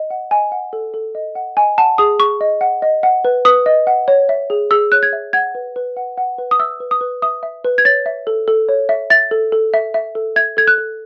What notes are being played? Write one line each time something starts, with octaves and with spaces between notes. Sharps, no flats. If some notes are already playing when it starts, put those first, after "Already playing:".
Already playing: D#5
F#5
D#5 G#5
F#5
A4
A4
D#5
F#5
D#5 G#5
F#5 A5
G#4 D#6
G#4 C#6
D#5
F#5
D#5
F#5
B4
B4 D#6
D#5
F#5
C#5
E5
G#4
G#4 E6
C#5 F#6
G#6
E5
F#5 G#6
B4
B4
F#5
F#5
B4
D#6
E5 E6
B4
D#6
B4
E5 D#6
E5
B4
G#6
C#5 A6
E5
A4
A4
C#5
E5
E5 A6
A4
A4
E5
E5
A4
E5 G#6
A4 G#6
F#6
A4